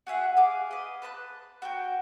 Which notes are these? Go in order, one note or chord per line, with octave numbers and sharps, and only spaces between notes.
F#4 G#4 E5 F#5
G#4 F5 D6
B4 D#5
B4 A5 A#5 F#6
F#4 A#4 G5